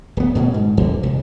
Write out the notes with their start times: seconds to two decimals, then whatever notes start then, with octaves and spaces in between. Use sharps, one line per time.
0.17 D1 B3
0.35 D1 B2
0.54 G#2
0.77 D#2 D3
1.03 C2